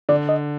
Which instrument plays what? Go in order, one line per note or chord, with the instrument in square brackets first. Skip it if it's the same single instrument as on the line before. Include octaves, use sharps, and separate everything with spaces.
[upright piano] D3 [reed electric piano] D5
[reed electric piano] D#5